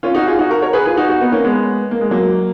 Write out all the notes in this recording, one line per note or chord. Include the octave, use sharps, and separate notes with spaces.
C#4 F4
D#4 F#4
F4 G#4
D#4 F#4
F#4 A#4
A#4 C#5
G#4 B4
F4 G#4
D#4 F#4
D#4 F#4
B3 D#4
A#3 C#4
G#3 B3
A#3
G#3
F#3 A#3